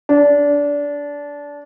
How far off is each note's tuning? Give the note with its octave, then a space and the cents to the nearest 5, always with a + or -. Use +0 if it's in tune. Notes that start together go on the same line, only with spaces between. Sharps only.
D4 -20